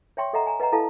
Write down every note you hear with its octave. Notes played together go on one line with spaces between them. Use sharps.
C#5 E5 G5 C6 C#6
A4 D#5 E5 F#5 A#5
G#5 A#5
B4 D#5 F5 F#5 A#5
E4 A4 F5 A5